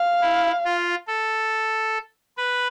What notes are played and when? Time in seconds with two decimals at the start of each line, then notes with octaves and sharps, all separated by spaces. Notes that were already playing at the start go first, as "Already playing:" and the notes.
Already playing: F5
0.22 E4
0.65 F4
1.08 A4
2.37 B4